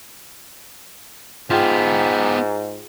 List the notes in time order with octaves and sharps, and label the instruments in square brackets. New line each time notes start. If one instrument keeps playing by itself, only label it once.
[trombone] G#2 [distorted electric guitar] B3 G4 [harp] F4 G#4 G5